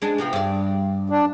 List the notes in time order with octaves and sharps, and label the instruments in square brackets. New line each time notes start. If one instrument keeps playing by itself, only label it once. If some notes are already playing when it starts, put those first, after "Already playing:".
[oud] G#3 D4
C3 F3 B3
G2 D5
[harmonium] D4